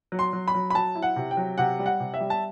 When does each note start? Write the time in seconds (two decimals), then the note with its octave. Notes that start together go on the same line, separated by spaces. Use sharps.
0.12 F#3
0.19 C6
0.33 F#3
0.48 B5
0.55 F#3
0.70 B5
0.75 F#3 A5
0.95 E4
1.02 F#5
1.16 C3
1.31 G5
1.37 F#3
1.58 C3 F#5
1.79 G3
1.86 F#5
2.00 C3
2.14 E5
2.20 G3
2.30 A5